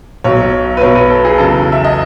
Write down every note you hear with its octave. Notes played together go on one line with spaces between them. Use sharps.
B1 B2 F#3 C#5
B4
B1 B2 F#3 C#5
B4
A4
G#4
E2 C#3 F#3 A4
E5
D#5